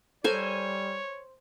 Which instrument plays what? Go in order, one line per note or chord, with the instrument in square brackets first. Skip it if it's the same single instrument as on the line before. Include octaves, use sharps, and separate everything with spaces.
[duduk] G3 [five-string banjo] A4 A#4 [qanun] C5 G#5 [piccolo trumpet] C#5